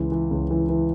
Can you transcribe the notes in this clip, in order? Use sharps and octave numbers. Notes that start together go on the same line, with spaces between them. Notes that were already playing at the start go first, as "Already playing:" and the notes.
Already playing: C#2 E3
E3
C#2
E3
E3